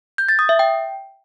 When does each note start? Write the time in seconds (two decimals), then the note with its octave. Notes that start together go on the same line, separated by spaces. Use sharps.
0.18 G6
0.29 A6
0.39 D#6
0.49 E5
0.59 G5